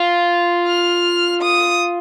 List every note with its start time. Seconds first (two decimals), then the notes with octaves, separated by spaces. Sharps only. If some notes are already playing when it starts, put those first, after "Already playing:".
Already playing: F4
0.67 F6
1.42 D#6